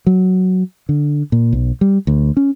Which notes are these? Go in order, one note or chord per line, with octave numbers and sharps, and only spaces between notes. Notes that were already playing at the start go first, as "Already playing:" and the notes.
F#3
D3
A#2
B1
G3
D2
C#4